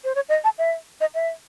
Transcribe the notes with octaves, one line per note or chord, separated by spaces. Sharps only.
C5
C#5
D#5
A5
E5
D#5
E5